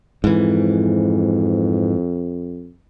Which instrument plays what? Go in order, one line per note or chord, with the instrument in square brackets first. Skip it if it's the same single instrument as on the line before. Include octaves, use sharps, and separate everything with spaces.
[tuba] F2 [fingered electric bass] G#2 E3